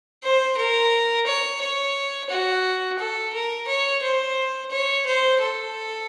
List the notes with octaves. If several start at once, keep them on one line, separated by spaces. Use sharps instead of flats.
C5
A#4
C#5
C#5
F#4
A4
A#4
C#5
C5
C#5
C5
A4